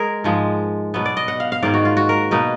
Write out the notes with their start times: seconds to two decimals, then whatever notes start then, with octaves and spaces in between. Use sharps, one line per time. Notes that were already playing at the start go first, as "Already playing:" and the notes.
Already playing: G#3 G#4 A#4
0.24 G#2 F3 G#3
0.94 B2 F#3 B3 B4
1.06 D5
1.17 D#5
1.28 F#5
1.40 F5
1.52 F5
1.63 G#2 D#3 A#3 D5
1.74 F#4
1.85 F4
1.97 F#4
2.09 A#4
2.31 B2 A#3 D#4 B4